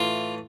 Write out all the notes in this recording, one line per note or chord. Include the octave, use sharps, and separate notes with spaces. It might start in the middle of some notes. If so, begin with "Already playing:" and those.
Already playing: A2 E3 F4